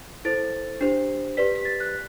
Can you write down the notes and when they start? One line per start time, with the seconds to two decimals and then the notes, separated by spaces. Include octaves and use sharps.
0.25 E4 A4 C5 A6
0.81 D4 G4 C5 C7
1.37 G4 B4 D5 B6
1.56 B6
1.65 A6
1.80 F#6